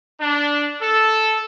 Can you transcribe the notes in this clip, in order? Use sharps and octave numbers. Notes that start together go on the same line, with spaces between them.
D4
A4